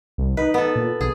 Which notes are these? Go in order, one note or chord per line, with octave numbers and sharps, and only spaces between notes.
C2
D#4 B4
B3 A4
A#2
B1 G#4